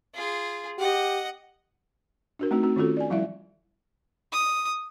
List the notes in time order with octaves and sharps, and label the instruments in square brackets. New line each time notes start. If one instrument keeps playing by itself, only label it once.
[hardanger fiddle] F4 G#4
[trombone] G4 [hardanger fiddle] D#5 F#5
[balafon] D4 F#4 A#4
A3 C4 D#4 F#4
C4 F#4
D#3 C#4 F4 F#4 A4
D5 G#5
F3 G3 E4 E5
[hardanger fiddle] D#6